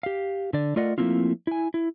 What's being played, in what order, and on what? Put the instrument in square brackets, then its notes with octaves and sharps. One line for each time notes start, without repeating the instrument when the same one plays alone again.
[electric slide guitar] G4 F5
D3 D5
A3 F4 A#4 D5 D#5 F#5
F3 A3 A#3 C4 E4 F4
E4 G#5
E4